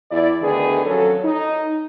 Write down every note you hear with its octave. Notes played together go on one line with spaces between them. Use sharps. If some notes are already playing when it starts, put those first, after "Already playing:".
E2 E4 D5
D2 D3 D#3 B3 G#4
F2 F#3 C#4 A4
D#4